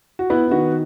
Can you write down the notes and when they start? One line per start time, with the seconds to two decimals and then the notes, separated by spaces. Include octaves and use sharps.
0.19 F#4
0.30 B3 E4
0.48 E4
0.51 D#3 F#4